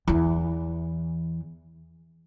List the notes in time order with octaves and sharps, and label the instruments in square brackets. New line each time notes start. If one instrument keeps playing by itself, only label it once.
[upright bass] E2 E3